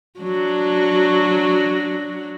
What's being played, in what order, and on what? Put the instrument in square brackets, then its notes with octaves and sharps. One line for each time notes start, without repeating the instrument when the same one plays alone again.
[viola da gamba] F#3 D4 F#4